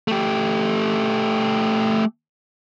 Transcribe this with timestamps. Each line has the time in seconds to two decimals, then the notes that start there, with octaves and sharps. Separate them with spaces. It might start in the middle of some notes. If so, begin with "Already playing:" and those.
0.08 A3 G4